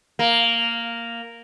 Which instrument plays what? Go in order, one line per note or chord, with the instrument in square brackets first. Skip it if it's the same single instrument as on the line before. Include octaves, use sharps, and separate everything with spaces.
[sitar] A#3